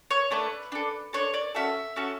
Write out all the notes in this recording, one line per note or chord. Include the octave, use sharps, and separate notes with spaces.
C#5
A3 D4 A4 B4
D4 A4
D4 A4 C#5
D5
C#4 F#4 A4 E5
C#4 F#4 A4